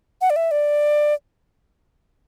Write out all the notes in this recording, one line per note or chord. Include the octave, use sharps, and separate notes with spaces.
F#5
D5
E5
D5